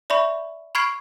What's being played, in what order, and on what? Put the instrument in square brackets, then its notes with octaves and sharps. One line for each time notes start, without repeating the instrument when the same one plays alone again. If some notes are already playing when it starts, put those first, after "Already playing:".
[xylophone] D5 E5 B5 C#6
B5 C#6 F6 G#6 C7 D7